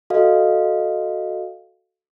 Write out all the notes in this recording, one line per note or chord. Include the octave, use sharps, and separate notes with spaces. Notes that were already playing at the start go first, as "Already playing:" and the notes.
F#4 A4 D#5 F5